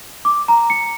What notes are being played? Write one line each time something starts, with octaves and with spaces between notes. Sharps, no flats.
D6
A#5
C#7